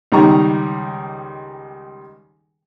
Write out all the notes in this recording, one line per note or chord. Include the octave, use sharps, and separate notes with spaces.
C#2 D#3 G3 D#4 A#5 C#6